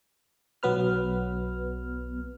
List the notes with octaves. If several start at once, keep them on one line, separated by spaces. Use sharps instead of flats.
B1 F#3 B3 B4 F6